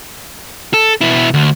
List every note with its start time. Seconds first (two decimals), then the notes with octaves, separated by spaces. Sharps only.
0.74 A4
1.01 B2 E4
1.34 D2